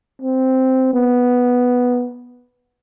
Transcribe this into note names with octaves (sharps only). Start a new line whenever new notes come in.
C4
B3